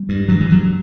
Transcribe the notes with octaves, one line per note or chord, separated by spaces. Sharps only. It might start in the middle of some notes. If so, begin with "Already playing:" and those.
Already playing: G3
G2
G2 F#3
E3
G2 F#3